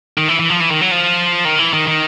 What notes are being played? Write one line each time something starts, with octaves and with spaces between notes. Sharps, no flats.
D#3
E3
E3
F3
E3
D#3
F#3
F3
D#3
E3
D#3
D#3